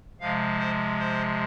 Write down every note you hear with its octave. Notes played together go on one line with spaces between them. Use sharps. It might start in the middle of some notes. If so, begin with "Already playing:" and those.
C3 F3 G#3 F5
C5
C5